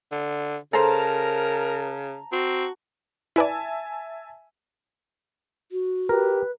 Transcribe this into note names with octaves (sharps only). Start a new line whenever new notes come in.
D3
C#3 A4 A#4 C5 A5 A#5
C4 F#4
E4 B4 D5 E5 G#5 A5
F#4
G4 A#4 B4